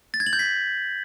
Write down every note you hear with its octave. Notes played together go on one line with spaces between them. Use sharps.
A6
G#6
F#7
G6
B6